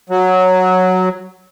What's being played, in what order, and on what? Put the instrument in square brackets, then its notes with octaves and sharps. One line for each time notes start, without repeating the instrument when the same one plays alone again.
[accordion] F#3